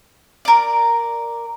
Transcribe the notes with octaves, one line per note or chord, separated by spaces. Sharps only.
A#4 D5